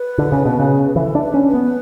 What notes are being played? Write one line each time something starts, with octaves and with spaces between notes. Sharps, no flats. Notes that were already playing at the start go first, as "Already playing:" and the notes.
Already playing: B4
D3
C#3
B2
C#3
B4
E3 A4
D4
B4
C#4
B4
B3